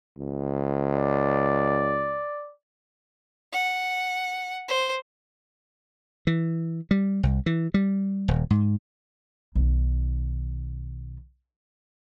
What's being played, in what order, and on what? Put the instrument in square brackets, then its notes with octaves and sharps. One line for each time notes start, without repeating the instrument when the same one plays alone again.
[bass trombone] C#2
[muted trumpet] D5
[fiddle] F#5
C5
[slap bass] E3
G3
C2
E3
G3
D#1
G#2
[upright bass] B1 D#3